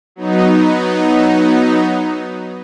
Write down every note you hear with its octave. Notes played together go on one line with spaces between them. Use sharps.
F#3 B3 D#4